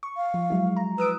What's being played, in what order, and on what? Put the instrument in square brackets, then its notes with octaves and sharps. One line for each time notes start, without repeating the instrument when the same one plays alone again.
[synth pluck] C#6
[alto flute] F5
[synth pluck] F3
F#3 G#3 E4
A#5
[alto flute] B4 [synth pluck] D#6 E6 D7